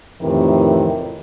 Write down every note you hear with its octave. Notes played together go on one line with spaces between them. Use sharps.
F2 A2 C3 D#3 E3